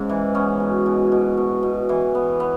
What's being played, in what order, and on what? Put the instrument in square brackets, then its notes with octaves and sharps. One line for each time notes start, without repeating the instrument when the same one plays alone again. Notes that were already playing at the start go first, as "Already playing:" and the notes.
Already playing: [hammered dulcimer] G#2 C#3 G#3
E3
B3 C#4
B2
B2
B2
B2
B2
E3
B3
B3